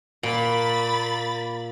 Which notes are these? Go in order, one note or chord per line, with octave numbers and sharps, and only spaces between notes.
A#2 A#3 B5 A6